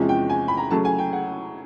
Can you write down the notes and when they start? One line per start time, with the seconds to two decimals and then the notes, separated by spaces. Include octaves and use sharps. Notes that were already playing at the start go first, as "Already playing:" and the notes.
Already playing: E2 C3 F3 G#3 C#4
0.09 G5
0.30 G#5
0.48 B5
0.57 A#5
0.71 C#3 F#3 A3 A5
0.85 G#5
0.98 G5
1.13 F#5